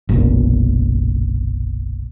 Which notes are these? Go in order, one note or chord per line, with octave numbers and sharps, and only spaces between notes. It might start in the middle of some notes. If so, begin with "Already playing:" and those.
F#1 B1 A#2